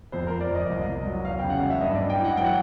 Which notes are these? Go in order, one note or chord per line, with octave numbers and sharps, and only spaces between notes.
F2 C5
F2 A#4
D5
F2 D#5
C2
C2
F#3
E2 F5
C#3 G5
F#5
F#3 F5
E5
G2 D#5
D5
G2
G5
E3
F#5
F#3 G5
F#5